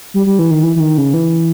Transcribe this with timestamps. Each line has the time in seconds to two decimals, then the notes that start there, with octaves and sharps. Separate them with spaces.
0.14 G3
0.26 G3
0.39 E3
0.51 D#3
0.63 E3
0.76 E3
0.80 D#3
0.98 C#3
1.14 E3